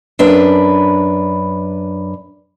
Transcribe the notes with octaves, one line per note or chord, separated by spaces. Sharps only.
F#2 D4 B4